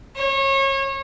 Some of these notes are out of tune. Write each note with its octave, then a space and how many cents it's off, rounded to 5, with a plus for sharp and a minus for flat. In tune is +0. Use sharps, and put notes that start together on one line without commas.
C#5 -30